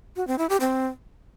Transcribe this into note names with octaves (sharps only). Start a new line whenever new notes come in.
F#4
C4
E4
G4
C4